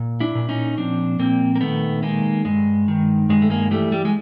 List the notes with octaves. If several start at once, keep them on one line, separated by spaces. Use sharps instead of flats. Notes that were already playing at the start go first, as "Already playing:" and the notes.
Already playing: A#2
D4 E4
A#2
C#4 D#4
F3 C4 D4
A#2 A#3 C4
A#3
D#3 A3 B3
D#3 G#3 A#3
G2 G#3
D#3
G2 G#3
A3
G#3 A#3
E3 G3 A3
G3
G#3